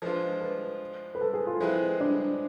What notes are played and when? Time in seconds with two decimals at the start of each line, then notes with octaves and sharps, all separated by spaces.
0.02 F3 G#3 D4 F4 B4
0.41 B4
1.15 B4
1.21 A4
1.33 G#4
1.47 F4
1.60 F3 G#3 C4 E4 G#4 B4
2.00 D4